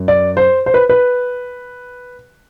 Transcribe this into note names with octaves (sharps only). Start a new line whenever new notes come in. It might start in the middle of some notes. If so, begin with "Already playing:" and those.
Already playing: F#2
D5
C5
C5
B4
B4